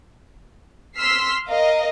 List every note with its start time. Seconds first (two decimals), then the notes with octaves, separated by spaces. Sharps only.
0.97 C6 E6 F6 B6 C7
1.48 A#4 D#5 F5